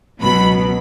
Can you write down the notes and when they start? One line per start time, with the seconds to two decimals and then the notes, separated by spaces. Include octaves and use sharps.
0.20 C#2 B2 F#3 B5